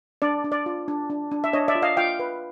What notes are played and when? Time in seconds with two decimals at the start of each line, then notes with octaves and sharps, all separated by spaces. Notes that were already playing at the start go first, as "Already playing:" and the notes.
0.22 D4 D5
0.44 D4
0.52 D5
0.66 F4
0.88 D4
1.10 D4
1.32 D4
1.44 E5
1.53 D4 C#5 D#5
1.68 D5 E5
1.75 F4
1.82 D#5 F5
1.97 F4 F5 G5
2.19 B4